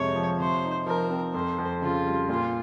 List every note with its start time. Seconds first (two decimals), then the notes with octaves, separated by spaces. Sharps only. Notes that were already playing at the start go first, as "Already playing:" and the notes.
Already playing: F2 C3 G#3 C#5
0.15 F3
0.39 C3 C5
0.64 D#4
0.86 F3 A#4
1.10 C4
1.34 F2 C5
1.58 F2
1.82 C#3 F4
2.06 G3
2.29 A#2 F4